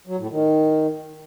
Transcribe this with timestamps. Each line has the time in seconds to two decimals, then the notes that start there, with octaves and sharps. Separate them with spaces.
0.07 F#3
0.19 A2
0.31 D#3